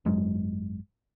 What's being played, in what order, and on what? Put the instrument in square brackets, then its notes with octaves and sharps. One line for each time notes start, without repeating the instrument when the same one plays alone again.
[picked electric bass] G#1 F#2 F#3 G#3